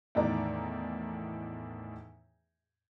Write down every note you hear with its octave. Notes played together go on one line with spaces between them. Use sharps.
E2 A2 D#3 D5 A#5